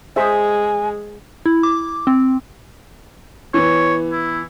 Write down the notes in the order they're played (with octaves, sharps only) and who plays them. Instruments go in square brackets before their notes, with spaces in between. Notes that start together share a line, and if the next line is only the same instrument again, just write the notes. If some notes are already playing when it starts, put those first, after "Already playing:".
[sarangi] G#3 [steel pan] G#4 C5 E5 [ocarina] G#5
[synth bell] E4
D6
C4
[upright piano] E3 B3 [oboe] C#5
[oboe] E4